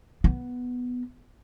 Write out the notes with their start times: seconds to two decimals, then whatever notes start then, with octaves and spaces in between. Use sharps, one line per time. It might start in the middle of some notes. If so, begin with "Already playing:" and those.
0.24 B3